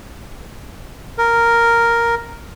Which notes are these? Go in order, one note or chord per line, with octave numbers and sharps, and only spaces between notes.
A#4